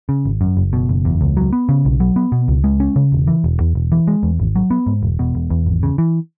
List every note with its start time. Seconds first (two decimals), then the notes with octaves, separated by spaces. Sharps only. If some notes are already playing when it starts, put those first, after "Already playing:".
0.09 C#3
0.25 G#1
0.41 F#2
0.57 F#1
0.73 B2
0.89 F#1
1.05 E2
1.21 C#2
1.37 F#3
1.53 B3
1.69 C#3
1.85 B1
2.00 F#3
2.16 B3
2.32 B2
2.48 C#2
2.64 G#3
2.80 C#4
2.96 C#3
3.12 E1
3.27 E3
3.44 E1
3.60 E2
3.75 E1
3.92 E3
4.08 G#3
4.23 E2
4.40 G#1
4.56 F#3
4.71 B3
4.87 G#2
5.03 E1
5.19 B2
5.35 E1
5.50 E2
5.66 G#1
5.83 C#3
5.98 E3